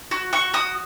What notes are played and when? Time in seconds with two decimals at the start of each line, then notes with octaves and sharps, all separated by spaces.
0.11 F#4
0.33 F#4 C#6
0.54 F#4 D#6